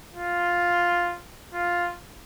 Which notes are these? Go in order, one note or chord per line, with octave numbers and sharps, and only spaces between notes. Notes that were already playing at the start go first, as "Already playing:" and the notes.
F4
F4